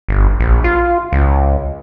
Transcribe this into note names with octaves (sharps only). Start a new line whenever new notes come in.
G1
A#1
F4
C#2